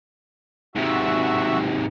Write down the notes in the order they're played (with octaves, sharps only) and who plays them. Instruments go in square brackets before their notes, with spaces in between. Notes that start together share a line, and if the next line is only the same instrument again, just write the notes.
[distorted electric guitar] G#2 C3 [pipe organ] F#4 E5